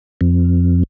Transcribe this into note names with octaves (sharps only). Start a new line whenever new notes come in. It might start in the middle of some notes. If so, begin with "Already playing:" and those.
F2